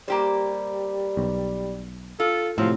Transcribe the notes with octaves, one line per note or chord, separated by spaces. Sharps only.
G3 A#3 G4 C5
B1
F4 A4
A2 C3 F3 F#3 C4